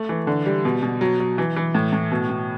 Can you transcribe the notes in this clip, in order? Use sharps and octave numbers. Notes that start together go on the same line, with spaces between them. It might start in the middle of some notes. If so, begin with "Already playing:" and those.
Already playing: A3
E3
D3
G3
B2
B2
F#3
F#3
E3
E3
A2
A2
B2
B2